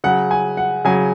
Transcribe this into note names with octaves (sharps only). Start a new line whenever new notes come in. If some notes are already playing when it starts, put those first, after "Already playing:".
C#3 F#3 F#5
G#5
F#5
C#3 F#3 G#5